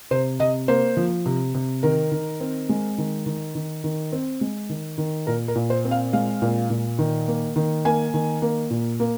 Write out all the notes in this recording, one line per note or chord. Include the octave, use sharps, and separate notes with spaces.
C3 C5
C3 D#5
A#3 C5
F3
C3
C3
D#3 A#4
D#3
C4
G#3
D#3
D#3
D#3
D#3
C4
G#3
D#3
D#3
A#2 A#4
A#4
A#2
C5
C4
F5
G#3 F5
A#2
A#2
D#3
A#3
D#3
A#3 G#5
D#3
A#3
A#2
A#3